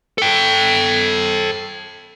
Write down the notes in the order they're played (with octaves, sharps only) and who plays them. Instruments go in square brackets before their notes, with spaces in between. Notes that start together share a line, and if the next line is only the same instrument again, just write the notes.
[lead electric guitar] A4 G5